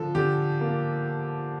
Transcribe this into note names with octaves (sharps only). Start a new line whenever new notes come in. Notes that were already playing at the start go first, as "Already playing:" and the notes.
Already playing: D3 F3 A4
D3 G4
A#3